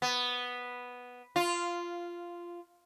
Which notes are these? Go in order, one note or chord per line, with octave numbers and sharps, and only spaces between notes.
B3
F4